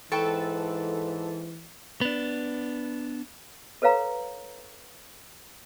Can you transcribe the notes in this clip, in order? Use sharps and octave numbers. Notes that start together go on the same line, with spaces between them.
G#2 E3 A4 B4 G5 C#6
B3 D4
A4 B4 C#5 F5 A#5